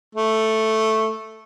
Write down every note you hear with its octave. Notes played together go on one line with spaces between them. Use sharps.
A3